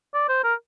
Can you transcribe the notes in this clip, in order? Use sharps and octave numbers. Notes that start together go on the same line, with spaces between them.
D5
C5
A#4